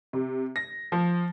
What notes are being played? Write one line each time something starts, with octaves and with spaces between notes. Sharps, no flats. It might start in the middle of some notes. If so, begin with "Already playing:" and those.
C3
A#6
F3